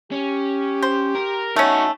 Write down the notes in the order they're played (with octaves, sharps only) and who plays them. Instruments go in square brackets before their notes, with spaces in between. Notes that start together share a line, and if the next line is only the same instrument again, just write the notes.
[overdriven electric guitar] C#4 [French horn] G4
[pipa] C5
[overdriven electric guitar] A#4
[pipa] A3 C#4 [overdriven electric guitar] D#4 F#4